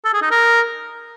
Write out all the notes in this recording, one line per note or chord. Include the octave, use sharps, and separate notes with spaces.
A4
G#4
D#4
A#4